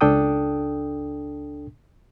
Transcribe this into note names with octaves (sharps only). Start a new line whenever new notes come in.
C#2 D4 A4 G5 D#6